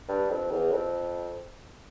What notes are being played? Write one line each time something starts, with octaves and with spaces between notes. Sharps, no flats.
G2
F2
E2
F2